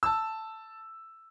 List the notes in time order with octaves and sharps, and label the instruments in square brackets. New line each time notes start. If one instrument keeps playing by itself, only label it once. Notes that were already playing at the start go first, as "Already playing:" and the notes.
[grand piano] A5 E6